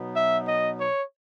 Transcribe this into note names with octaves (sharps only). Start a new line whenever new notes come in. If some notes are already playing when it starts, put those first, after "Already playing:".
Already playing: B2 F#3 B3 D#4
E5
D#5
C#5